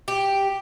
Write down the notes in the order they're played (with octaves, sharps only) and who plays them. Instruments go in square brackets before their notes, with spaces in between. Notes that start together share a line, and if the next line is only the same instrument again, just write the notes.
[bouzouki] G4